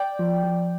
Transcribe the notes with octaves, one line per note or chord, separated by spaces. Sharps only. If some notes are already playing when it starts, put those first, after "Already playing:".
Already playing: D5 G5
F3
F3